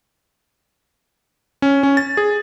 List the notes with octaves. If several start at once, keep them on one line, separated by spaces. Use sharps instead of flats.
C#4
C#4
A6
G#4